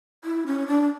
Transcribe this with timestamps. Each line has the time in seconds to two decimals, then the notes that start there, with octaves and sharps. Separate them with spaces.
0.24 E4
0.47 C#4
0.68 D4